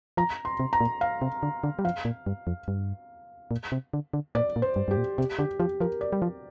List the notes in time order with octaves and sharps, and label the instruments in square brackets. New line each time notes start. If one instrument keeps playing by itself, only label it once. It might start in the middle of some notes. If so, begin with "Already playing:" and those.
[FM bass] F3 [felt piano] A#5
[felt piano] C6
[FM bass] C3
[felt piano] A#5
[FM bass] A#2
[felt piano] F5
[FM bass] C3
D3
D3
G3
[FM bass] F3 [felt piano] F5
[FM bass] A#2
G2
F2
G2
A#2
C3
D3
D3
[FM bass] A#2 [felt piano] D5
[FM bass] A#2
[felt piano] C5
[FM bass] G2
[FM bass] G2 [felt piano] G4
[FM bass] A#2
[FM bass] C3 [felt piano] G4
[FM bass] D3 [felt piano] G4
[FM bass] F3 [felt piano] G4
[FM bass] F3 [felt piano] A#4
[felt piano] D5
[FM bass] G3
F3